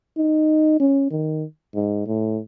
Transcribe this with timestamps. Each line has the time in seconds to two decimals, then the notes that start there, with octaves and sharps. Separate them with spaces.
0.17 D#4
0.80 C#4
1.11 D#3
1.75 G#2
2.06 A2